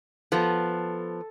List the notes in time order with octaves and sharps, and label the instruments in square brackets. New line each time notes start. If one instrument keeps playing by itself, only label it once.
[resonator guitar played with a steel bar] F3 B3 [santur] A4